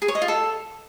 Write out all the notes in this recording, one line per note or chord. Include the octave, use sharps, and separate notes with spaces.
G#4
C#5
D#5
F4
A4